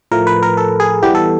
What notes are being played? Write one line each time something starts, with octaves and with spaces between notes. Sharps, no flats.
A2 F3 A3 A#4
B4
A#4
A4
G#4
E3 G3 B3 G4
A4